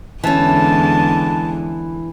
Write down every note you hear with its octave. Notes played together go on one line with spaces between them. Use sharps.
E2 D3 E3 G#3 C#4 A5